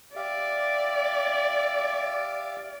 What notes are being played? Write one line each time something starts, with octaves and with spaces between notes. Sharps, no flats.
G4 D5 E5 F5